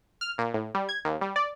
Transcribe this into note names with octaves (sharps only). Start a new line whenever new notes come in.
F6
A#2
A2
G3
G#6
D#2
G3
D5